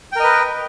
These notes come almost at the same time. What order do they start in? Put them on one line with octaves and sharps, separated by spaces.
G5 A#4 D#5 B4